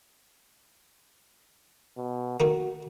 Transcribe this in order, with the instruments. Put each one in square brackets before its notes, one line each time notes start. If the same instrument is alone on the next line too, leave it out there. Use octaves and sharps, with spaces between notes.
[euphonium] B2
[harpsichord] D#3 A3 A#3 [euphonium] F#4